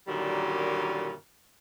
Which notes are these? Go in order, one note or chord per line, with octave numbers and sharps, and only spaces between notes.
F#2 A#2 D3 D#3 F#3 G3